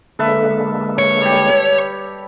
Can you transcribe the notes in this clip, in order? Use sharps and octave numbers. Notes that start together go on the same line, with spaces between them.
D3 G#3 A#3 A4 B4 E5
C#5
G3 G4